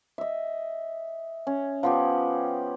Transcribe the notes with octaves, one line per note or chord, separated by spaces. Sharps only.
D#5 E5
C#4
F3 B3 G4